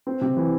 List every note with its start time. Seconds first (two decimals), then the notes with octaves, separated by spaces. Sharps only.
0.07 C4
0.21 C3
0.37 E3